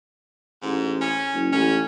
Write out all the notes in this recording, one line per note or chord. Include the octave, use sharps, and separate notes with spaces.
A1 G#2
C#4
F#1
A1 C#4